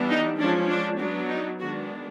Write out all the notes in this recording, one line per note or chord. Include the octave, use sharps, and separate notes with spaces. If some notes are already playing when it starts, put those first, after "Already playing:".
Already playing: E3 G3 B3 D4
D#4
F3 G#3 C#4 D4
D4
F#3 B3 D4
D#4
D#3 G#3 B3 D4 F#4